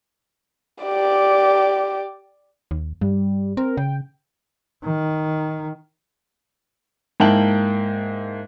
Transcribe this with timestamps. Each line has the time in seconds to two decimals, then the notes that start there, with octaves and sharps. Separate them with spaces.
0.83 G4 D5
2.71 D#2
3.01 G2 G3
3.57 C4 A#4
3.77 C#3 G5
4.84 D#3
7.20 G#2 A#3 E4 G5 A5 F#7